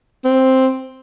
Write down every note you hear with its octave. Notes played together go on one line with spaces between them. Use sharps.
C4